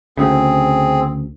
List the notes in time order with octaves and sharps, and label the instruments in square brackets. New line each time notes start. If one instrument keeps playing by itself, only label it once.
[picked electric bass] D2 C#3 [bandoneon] C4 G#4